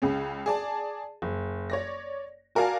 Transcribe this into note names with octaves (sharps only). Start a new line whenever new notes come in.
C#2 C#3 C#4
G#4 D5 A5
F#1
C#5 D5 A#6
F#4 A#4 D5 F5 G#5 A5